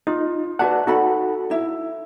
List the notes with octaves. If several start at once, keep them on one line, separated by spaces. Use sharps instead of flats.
D#4 F4
F#4 B4 D5 E5 F#5 A5
D#4 F#4 A4 F#5 B5
D#4 E4 E5